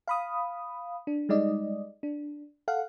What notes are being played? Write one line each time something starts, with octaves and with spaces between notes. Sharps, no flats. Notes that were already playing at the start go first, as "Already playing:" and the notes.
F5 B5 D#6
D4
G3 G#3 D#4 D5 D#5
D4
A4 F5 F#5